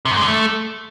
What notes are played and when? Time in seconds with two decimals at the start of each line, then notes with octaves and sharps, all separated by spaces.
0.05 C3
0.11 F#2
0.17 G#3
0.22 D3
0.28 A3